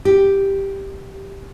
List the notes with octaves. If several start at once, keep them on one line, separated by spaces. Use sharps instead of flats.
G4